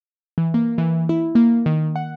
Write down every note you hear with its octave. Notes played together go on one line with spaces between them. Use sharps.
E3
A#3
E3
E4
A#3
D#3
F#5